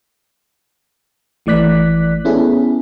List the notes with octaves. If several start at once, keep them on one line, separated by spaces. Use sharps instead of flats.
G#1 E3 A3 D5 F#6 B6
B3 C#4 E4 G#4 A4